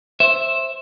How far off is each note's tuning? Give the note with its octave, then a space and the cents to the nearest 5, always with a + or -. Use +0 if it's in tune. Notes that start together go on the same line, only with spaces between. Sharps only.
C5 +20 E5 +0